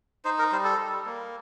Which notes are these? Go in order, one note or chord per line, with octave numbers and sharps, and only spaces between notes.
D#4 C5
A#4
G3 C5
A4
G3
A#3